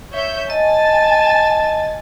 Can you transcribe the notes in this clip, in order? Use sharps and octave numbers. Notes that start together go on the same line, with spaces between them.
C#5 E5 G6
D#5 G#5 A5 A6